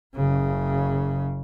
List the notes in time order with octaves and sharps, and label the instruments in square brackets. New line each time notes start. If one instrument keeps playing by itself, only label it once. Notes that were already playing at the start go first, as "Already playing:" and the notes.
[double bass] F#1 C#3